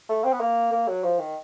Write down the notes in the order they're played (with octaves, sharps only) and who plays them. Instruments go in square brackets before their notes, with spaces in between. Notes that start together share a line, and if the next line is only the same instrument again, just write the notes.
[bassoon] A3
C4
B3
A#3
A#3
F#3
F3
D#3